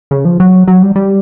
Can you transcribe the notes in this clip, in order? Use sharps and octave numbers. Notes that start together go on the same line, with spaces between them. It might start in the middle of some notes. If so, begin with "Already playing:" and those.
C#3
F3
F#3
F#3
G3
G3